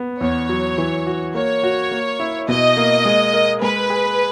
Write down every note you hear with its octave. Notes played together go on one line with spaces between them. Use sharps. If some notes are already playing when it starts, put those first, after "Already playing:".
Already playing: B3
E2 C#5
F#3
E3
F#4
A#3 C#5
F#4
A#3
E4
B2 D#5
A#3
G#3
A#4
G#3 B4
G#4